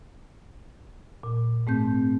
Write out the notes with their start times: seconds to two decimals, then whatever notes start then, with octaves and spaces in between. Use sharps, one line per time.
1.23 A#2
1.67 G#2 A3 C4 G6